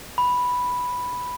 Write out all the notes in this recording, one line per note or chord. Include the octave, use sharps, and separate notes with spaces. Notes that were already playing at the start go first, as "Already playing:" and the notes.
B5